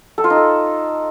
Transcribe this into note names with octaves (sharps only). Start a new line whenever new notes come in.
A4
F4
D#4
A4